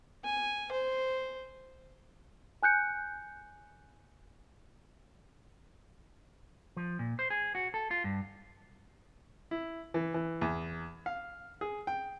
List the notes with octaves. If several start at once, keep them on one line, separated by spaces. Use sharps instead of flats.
G#5
C5
G#5 F#6 G6 C#7
F3
A#2
C5
G#4
F#4
A4
F4
G2
E4
E3
E3
E2
F5
G#4
G5